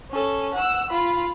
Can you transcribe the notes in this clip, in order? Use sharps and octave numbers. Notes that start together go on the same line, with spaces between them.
C#4 A4
F#5 E6
F4 B5